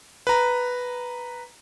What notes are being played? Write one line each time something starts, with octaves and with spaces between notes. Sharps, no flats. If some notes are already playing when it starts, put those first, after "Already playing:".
B4 A#5